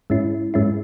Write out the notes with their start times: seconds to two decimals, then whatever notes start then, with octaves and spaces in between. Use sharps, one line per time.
0.10 G#2 G#3 C#4 E4
0.54 G#2 G#3 C#4 E4